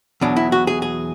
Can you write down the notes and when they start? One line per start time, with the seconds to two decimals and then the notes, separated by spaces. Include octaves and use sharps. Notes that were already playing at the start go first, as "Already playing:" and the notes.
0.21 E2 B2 F#3 D4
0.36 E4
0.52 F#4
0.67 G#4
0.82 G#4